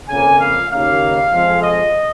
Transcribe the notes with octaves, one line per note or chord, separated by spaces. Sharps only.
F2 C#3 A#3 G#5
F5
D#2 C#3 A#3 F5
F2 F3 G#3
D#5